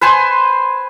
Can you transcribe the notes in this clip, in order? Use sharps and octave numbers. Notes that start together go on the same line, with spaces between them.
B4 C5 G#5 C6